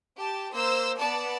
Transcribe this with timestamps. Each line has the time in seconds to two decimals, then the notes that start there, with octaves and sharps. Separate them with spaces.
0.18 G4 A5
0.53 A#3 C5 E6
0.98 B3 D5 A5